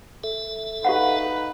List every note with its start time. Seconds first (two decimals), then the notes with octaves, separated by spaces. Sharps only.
0.24 A4 E5
0.85 D#4 G4 B4 F5 F#5